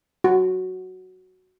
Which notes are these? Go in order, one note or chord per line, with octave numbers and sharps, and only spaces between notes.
F#4